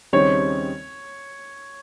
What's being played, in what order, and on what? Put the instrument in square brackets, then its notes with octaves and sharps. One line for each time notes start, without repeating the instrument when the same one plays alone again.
[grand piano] D#2 C#3 G3 C4 D#4 [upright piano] C#5